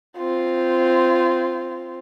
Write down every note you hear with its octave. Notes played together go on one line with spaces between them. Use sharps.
C4 F4